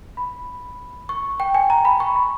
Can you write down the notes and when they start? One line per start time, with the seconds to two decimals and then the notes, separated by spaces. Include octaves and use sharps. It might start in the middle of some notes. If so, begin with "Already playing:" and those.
0.17 B5
1.09 C#6
1.40 G5
1.54 G#5
1.70 A#5
1.85 B5
2.00 C#6
2.16 B5